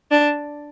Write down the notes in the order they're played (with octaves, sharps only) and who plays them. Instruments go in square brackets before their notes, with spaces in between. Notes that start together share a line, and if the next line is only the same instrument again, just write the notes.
[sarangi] D4